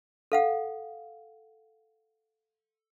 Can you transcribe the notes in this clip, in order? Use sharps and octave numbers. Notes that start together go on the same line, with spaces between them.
A4 F5 F#5